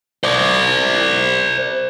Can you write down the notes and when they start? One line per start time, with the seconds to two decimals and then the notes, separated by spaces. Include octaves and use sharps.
0.24 C5 D5